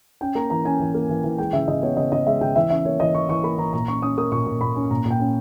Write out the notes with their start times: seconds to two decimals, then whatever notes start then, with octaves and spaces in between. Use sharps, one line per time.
0.21 C#4 G5
0.35 A#3 A#5
0.50 E3 A#5
0.65 C#4 G#5
0.80 E3
0.94 A#3
1.09 E3
1.24 E3
1.38 G#3 G5
1.53 C#3 E5
1.68 C#3 D#5
1.82 B3 C#5
1.97 C#3 D#5
2.12 C#3 D#5
2.26 G#3 E5
2.41 C#3 G5
2.56 E3 E5
2.70 C#4 E5
2.85 A#3 C#5
3.00 E3 D#5
3.15 E3 C#6
3.29 E3 C#6
3.44 A#3 B5
3.58 E3 A#5
3.73 A#2 A#5
3.88 C#4 C#6
4.02 C#4 D#6
4.18 A#3 D#6
4.32 A#2 C#6
4.46 A#2
4.61 A#2 B5
4.76 C#4
4.91 A#2 A#5
5.05 A#2
5.10 G5
5.20 C#4